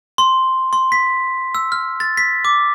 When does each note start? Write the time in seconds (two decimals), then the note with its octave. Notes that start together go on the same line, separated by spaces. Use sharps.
0.18 C6
0.73 C6
0.92 B6
1.55 E6
1.72 F6
2.00 A6
2.17 B6
2.45 D6